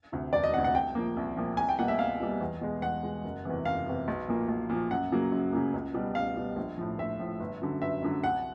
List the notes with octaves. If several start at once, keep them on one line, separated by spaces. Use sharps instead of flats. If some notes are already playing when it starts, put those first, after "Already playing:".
D2 C3
E1 D5
D#5
D2 C3 F#5
F#5
C2 G5
A#2 F3 A#3
C2
A#2 F3 A#3
C2 G#5
G5
B2 G3 A#3 F#5
E5
C2 F5
B2 G3 A#3
E2
B2 G#3
E2 F#5
B2 G#3
F#1
E2 C3 E3
F#1 F5
E2 C3 E3
B1
A#2 F3 A#3
B1
A#2 F3 A#3
F#2 F#5
C#3 F#3 A#3
F#2
C#3 F#3 A#3
C#2
B2 G3
C#2 F5
B2 G3
A#1
A2 F3
A#1 E5
A2 F3
G1
F#2 D3 F#3
G1 E5
F#2 D3 F#3
C2 F#5